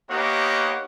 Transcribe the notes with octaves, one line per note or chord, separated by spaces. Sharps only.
A#3 B3 D#4 G4 C#5 F#5